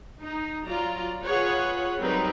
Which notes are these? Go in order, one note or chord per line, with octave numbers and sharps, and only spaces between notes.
D#4
F#3 F4 D5 A#5
F4 G#4 B4 C#5 F#5
F#3 G3 C4 D#4 A#4 B4